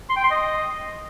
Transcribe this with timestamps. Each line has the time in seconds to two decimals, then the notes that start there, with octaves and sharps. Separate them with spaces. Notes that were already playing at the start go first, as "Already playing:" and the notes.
0.09 C6
0.16 G5
0.24 C6
0.31 D#5